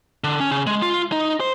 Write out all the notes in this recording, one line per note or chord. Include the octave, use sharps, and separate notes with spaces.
D3
C#4
C#3
G#3
F4
D#4
C5